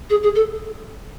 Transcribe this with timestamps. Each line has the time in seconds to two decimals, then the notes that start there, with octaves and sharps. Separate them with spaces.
0.10 G#4
0.23 G#4
0.35 A4